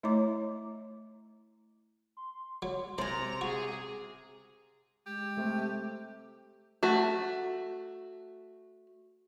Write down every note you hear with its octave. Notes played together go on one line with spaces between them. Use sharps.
A3 E4 C#5 D#5 A#5 D6
C6
F#3
C3 A#4 C5 D5 G#5 A#5 F7
F#4 G#4
G#3 G4
C3 A3
A3 F#4